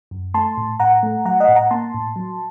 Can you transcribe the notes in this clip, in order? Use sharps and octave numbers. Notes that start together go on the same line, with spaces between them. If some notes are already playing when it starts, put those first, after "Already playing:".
F#2
A3 A5 C6
A2
A2 F#5 A#5
A3
F#3 F#5 A#5
D#5 F#5
A2
F#5 A#5
A#3 A5 C6
A2
F#3